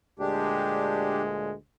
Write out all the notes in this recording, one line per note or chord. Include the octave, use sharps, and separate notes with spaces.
D2 A#2 G#3 D4 G4